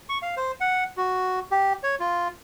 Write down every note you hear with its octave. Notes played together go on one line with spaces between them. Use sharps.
C#6
F5
C5
F#5
F#4
G4
C#5
F4